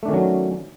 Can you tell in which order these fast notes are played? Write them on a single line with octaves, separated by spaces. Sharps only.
A3 D4 D#3 C#4 F#3